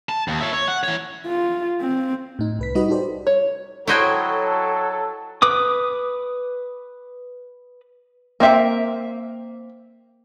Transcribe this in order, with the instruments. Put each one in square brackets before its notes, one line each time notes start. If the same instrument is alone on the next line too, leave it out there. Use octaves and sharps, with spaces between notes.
[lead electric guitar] A5
D#2
C#5 E5
C#5
F#5
E3 C#5
[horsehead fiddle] F4
C4
[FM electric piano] A2 D#4
C2 B4 B6
G3 D#4 F#4 B4 D#5
D#4 F#4 G4 A4 C5 D5
[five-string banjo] C#5
[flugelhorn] F#3 [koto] E4 D#5 G5 [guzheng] F#4 C5 C#5 [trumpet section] A4
[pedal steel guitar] B4 D6 D#6
[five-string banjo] A#3 C4 E5